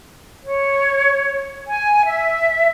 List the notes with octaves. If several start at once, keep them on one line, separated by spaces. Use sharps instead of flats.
C#5
G#5
E5